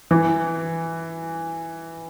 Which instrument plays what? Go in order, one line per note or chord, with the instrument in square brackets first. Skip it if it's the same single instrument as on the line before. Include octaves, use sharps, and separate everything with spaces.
[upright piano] E3